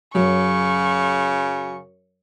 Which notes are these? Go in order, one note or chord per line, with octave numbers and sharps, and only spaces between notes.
F#2 C#3 C#6